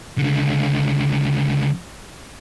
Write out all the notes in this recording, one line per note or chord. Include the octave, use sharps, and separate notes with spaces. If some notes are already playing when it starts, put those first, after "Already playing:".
C#2 D3